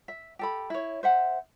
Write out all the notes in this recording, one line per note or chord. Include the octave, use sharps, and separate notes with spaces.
E5
G4 A4 B5
E4 C#5
C5 E5 F#5